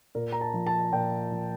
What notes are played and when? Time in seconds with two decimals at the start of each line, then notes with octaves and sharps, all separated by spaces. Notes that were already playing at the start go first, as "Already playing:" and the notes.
0.15 A#2 A#4
0.32 A#5
0.41 A5
0.54 F3
0.67 A5
0.92 A#2 G5
1.32 F3